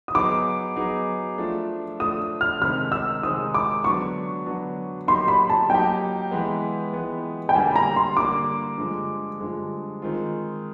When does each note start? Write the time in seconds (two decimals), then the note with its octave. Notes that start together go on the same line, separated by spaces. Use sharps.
0.08 D#6
0.14 F#3 B3 D#4 G#4 D6
0.76 F#3 B3 D#4 G#4
1.38 F3 A3 D4
1.99 F3 A3 D4 D#6
2.41 F6
2.61 C3 D#3 G#3 C4 D#4 F6
2.92 E6
3.23 C3 D#3 G#3 C4 D#4 D#6
3.54 D6
3.84 D3 F#3 B3 D4 C#6
4.46 D3 F#3 B3 D4
5.08 F#3 A#3 D#4 G4 C6
5.28 B5
5.50 A5
5.70 F#3 A#3 D#4 G4 G5
6.31 E3 G#3 B3
6.93 E3 G#3 B3
7.49 G5
7.55 D3 G3 A#3 G#5
7.71 B5
7.76 A#5
7.96 C6
8.16 D3 G3 A#3 D6
8.78 G2 D3 F3 G#3
9.40 G2 D3 F3 G#3
10.02 D#3 G#3 C4 F4